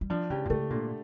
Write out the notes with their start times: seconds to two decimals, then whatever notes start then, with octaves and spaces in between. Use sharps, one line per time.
0.01 G3
0.10 F3 D4
0.30 C#3 G4
0.45 A#2
0.50 C#3 A3
0.70 A#2 D3